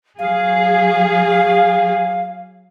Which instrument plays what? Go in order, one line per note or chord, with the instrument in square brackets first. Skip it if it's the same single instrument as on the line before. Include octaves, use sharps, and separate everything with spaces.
[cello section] F#3 G#4 [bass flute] F5